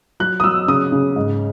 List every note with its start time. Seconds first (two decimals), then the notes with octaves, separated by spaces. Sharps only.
0.20 F#3 F#6
0.40 D#6
0.44 F#3 E6
0.68 C#3 D#6
0.92 C#3
1.16 G#2